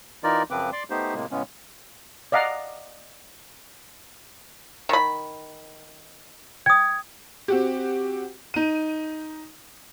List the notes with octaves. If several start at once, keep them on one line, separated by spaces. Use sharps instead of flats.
E3 D#4 F4 A#4 D5
F#2 C#3 F3 C4 B4 D6
D5 C6 D6
A3 B3 D#4 G4 C5
A2 C3 G#3 A#3
A2 C#3 G#3 B3 C#4
D5 D#5 F5 F#5 A#5
D#3 B5
G5 D#6 G#6
C4 F#4 G4
D#4 D#7